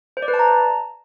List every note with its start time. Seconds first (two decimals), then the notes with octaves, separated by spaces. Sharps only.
0.17 C5
0.22 D5
0.28 B4
0.34 A5
0.39 A#5